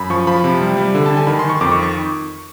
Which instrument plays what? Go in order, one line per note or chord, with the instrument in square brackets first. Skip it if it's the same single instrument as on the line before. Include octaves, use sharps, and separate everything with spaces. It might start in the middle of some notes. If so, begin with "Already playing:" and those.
Already playing: [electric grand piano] F#2 B5
F3 C#6
F3 B5
C3
G3
G3
D3
D3 A5
G#5
D#3 B5
C6
D#3 C#6
F2 D6
C#6
C#6